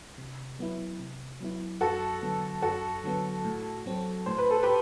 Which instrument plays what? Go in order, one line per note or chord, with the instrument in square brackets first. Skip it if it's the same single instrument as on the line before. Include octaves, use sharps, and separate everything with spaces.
[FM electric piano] C3
F#3 B3 E4
C3
F#3 B3 E4
[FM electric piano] F#2 [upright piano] F#4 A4
[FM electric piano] D3 F#3 B3
[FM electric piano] F#2 [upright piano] F#4 A4
[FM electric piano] D3 F#3 B3
A2
F#3 C4
[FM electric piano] A2 [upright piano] C5
[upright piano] B4
A4
G4 B4